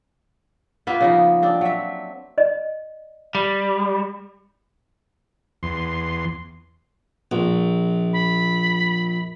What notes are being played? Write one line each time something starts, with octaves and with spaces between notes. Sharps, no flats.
A#3 B3 F4 E5
C#3 F3 D#4
C4 D4
F#3 E5
D5 D#5
G3
E2 C6
A#1
B5